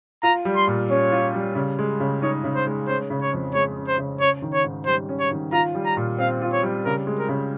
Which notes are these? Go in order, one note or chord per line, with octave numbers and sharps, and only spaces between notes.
F4 A#5
G3
C6
A#2
C#4 C#5
F4
G3
C#3
G#3
C#3
D#4 C#5
C#3
C5
G#3
C#4 C5
C#3
C#5
F2
G#3 C#5
C#4
C5
C#3
C#4 C#5
D#3
C#5
G#2
G3 C5
C#4
C#5
D#3
F4 A#5
G3
A#5
A#2
C4 F5
F4
C#5
G3
C#3 A#4
G#3
A#4
C#3